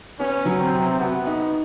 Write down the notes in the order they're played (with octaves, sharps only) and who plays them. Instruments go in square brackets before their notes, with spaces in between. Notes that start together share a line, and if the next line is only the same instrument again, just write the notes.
[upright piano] B3 [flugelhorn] C#4
[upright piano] F#3
[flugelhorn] C4
[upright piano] C3
[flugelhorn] B3 [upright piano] F#4
[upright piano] D#4